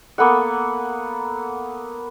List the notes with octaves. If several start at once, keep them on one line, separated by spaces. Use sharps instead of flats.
A#3 B3 A4 F#5